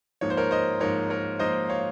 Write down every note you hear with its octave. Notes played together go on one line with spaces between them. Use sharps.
G#2 F3 A#3 D#4 C#5
C5
A#4 C#5
C5 D#5
G#2 F3 A#3 D#4 A#4 C#5
A#4 C#5
G#2 F3 A#3 D#4 C5 D#5
C#5 F5